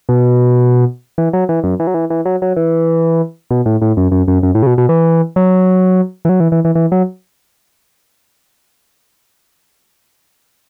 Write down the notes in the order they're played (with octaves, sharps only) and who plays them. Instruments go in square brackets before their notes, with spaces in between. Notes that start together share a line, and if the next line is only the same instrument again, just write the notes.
[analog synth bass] B2
E3
F#3
E3
F#2
E3
F#3
E3
E3
F#3
F#3
E3
B2
A2
A2
F#2
F#2
F#2
F#2
A2
C#3
B2
B2
E3
F#3
E3
F#3
E3
E3
E3
E3
F#3